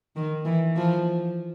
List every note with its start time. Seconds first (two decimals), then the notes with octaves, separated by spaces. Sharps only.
0.16 D#3
0.45 E3
0.76 F3